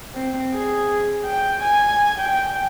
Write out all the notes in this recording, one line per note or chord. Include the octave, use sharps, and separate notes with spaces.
C4
G#4
G5
G#5
G5